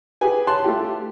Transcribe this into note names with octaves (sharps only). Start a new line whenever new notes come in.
G4 G#4 B4 G#5
C#5 A5 C6 F#6
A3 F4 G4